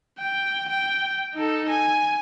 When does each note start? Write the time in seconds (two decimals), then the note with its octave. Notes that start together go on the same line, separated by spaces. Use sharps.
0.19 G5
0.68 G5
1.34 D#4 A4
1.69 G#5